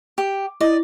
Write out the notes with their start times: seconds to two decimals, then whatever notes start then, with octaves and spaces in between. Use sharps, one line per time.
0.18 G4
0.61 E4 D5 D#5